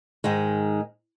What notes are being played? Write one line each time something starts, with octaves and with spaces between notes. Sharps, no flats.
G#2 D#3 G#3